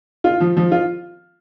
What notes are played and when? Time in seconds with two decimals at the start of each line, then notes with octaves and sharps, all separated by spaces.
0.24 F4
0.40 F3
0.57 F3
0.72 F4